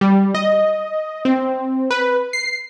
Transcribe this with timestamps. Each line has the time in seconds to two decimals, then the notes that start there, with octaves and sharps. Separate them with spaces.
0.01 G3
0.35 D#5
1.25 C4
1.91 B4
2.33 C7